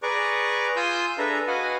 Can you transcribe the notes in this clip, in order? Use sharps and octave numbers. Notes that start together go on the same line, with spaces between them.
G#4 B4 D5 A#5 C#6 D6
F4 G#5 C6 D#6 E6 G6
D4 G#4 A4 B4 E5 A#5
F#4 B4 D#5 F5 F#5 G#5